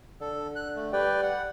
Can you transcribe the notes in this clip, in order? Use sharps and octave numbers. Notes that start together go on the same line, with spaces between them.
D3 A4
F#6
A3
G3 B4 D5 G5
F#5